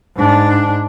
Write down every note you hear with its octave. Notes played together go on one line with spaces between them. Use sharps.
G#2 D4